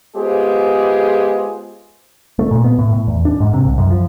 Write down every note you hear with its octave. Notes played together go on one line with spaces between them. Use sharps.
G#3 B3 F4 G4 G#4 C5
A3
A#2
B3
A2
A2
E2
D4
G#2
C3
C2
F#2
F3